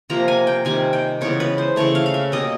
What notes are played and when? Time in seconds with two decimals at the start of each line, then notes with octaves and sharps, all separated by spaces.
0.10 C3 F3 A#3 A#5
0.28 G#5
0.47 G5
0.65 C3 D#3 G3 G#5
0.93 G5
1.21 C#3 E3 G#3 B3 C#5
1.40 B4
1.58 C5
1.76 C#3 E3 A3 C#5
1.95 F5
2.06 F5
2.14 E5
2.32 B2 G3 A#3 D#5